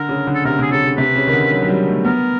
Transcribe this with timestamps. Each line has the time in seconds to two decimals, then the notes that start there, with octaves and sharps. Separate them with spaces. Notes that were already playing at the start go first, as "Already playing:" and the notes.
Already playing: D3 A#4
0.09 C#3
0.27 D3
0.35 A4
0.45 C3 A#4
0.59 C3 G#4
0.71 C#3 A4
0.84 C#3
0.98 C3 B4
1.16 C#3
1.27 D#3
1.33 D3
1.51 F#3
1.63 F#3
1.68 G3
1.87 A3
2.05 B3 A#4